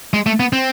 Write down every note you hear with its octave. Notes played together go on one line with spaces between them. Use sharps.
G#3
A3
B3
C4